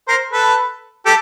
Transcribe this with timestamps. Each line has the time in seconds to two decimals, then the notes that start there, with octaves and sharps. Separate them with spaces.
0.08 A#4 C5
0.32 A4 B4
1.06 G4 A4